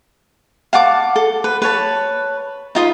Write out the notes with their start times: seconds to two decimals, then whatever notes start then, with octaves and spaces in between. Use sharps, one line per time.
0.73 F5 F#5 A5 D6
1.16 A4
1.44 B4
1.62 B4 C#5 A5
2.75 D#4 F4 D#5 B5